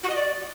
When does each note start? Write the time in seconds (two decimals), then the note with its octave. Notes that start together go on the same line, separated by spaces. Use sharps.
0.03 F#4
0.09 D#5
0.15 D5